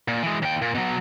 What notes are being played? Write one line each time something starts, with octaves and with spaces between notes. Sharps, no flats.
A#2
E3 G#3
D#2 G5
A#2
B2 F#3